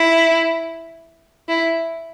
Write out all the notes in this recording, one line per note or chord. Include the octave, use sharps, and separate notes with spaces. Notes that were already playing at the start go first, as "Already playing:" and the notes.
Already playing: E4
E4